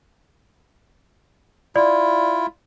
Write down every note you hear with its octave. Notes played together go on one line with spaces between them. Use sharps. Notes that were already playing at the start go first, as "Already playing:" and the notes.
E4 F4 D5